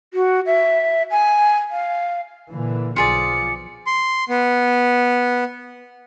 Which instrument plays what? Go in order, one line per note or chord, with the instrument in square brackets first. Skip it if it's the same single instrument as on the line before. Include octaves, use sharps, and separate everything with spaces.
[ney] F#4
E5
G#5
F5
[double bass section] A#2 D3 E3
[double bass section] B1 F3 [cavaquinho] F4 G#4 D5 [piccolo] C#7
[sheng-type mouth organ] C6
B3